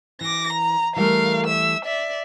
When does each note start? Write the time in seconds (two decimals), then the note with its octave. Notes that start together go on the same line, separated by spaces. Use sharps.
0.21 E3 D6 A#6
0.53 A#5
0.96 E3 G3 A3 A#4 F5
1.47 E5 E6
1.85 D5 E5